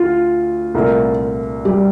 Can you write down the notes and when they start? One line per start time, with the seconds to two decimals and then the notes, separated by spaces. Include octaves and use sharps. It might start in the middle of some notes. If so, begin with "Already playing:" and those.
Already playing: D2 F4
0.74 C2 A#2 A3 E4 A#4
1.65 G3 G4